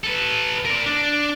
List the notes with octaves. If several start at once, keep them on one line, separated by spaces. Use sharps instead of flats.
A4 B4
A#4 D5
D4